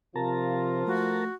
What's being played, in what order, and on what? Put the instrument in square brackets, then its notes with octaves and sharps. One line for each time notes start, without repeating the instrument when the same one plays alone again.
[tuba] C3 [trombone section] F3 F4 [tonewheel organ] A#4 A5 A#5
[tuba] A3 [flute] F#4